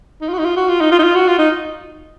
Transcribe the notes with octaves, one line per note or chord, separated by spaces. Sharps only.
D#4
F4
F#4
D#4
F4
F#4
F4
D#4
F4
D#4
F4
F#4
F4
D#4